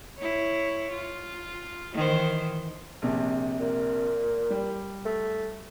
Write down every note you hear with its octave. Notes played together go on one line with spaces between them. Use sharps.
E4 C#5
F4
D#3 E3 C5
A#1 C3
A#2
G3
A3